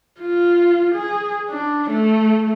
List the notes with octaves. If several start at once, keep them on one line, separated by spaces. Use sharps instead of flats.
F4
G#4
D4
A3